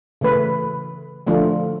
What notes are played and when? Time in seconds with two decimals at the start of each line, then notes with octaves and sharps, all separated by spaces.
0.21 C#3 E3 A3 B4
1.27 D3 F3 A3 D4 F4